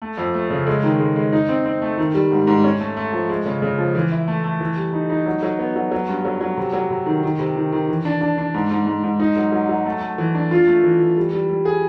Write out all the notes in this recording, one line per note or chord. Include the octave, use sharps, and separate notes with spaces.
A3
F2
A3
C#3
G#3
D#3
G#3
G#3
D#4
C4
C4
A3
D#3
G3
G#2
G#2
C#4
A3
A3
F3
G#3
C#3
C#3
F3
E3
E4
A3
A3
E3
G3
D#4
D#4
F#3
F#3
B3
F#3
F#3
G2
F#3
F#3
C3
F#3
C3
D#3
D#3
C3
D#3
D#3
E3
D4
D4
D4
G#2
G#2
G#2
G#2
D#4
F#3
F#3
F#3
A3
A3
E3
D4
F4
A3
E3
E3
G3
G3
G3
G#4